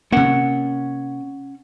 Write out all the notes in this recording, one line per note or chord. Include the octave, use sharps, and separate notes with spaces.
C3 A#3 C#4 F#5